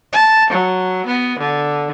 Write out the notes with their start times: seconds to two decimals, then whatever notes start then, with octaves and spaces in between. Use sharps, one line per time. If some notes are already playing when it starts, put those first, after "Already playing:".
0.13 A5
0.50 F#3
1.06 B3
1.39 D3